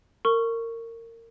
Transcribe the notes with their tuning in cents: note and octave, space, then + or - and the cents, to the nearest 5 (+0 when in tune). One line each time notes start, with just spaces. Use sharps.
A#4 -25 C#6 +0